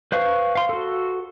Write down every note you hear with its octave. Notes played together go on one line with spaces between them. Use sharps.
B4 C5 F5 C#6
F5 C6
F#4 A4